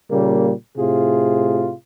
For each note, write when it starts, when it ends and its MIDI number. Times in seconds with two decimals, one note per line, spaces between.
0.10 0.52 46
0.10 0.52 49
0.10 0.52 55
0.10 0.52 58
0.78 1.72 45
0.78 1.72 48
0.78 1.72 65
0.78 1.72 68